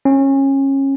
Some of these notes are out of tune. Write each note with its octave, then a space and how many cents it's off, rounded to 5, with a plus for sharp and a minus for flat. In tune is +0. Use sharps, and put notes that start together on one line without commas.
C#4 -25